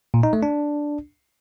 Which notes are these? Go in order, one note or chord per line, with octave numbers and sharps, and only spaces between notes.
A#2
D#4
A3
D4